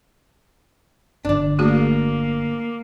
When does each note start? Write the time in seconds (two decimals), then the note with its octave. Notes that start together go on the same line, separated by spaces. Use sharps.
1.25 G1 D3 D4 D5
1.59 A3 A#3 F#4 G#4